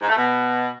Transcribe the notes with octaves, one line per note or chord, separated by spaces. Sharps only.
G#2
A3
B2